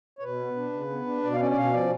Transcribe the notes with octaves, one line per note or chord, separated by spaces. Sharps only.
C#5
B2 B4
B3
D4
C#3
B3
D4
B2 D5
F5
C#4 D5
D5
B2 F5
F3 D5